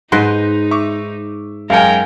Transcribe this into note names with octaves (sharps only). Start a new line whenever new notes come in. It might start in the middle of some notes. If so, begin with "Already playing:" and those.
G#2 D#4 B4 C5 C6 F#6 A#6
E5 C#6 D6
F#2 G#3 A#4 F5 G5 G#5 C#7